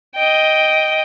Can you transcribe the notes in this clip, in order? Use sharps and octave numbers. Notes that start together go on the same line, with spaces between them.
D#5 G5